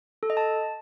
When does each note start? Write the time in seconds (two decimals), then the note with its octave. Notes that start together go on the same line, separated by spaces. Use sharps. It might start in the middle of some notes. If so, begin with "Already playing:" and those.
0.23 A4
0.30 D#5
0.37 A5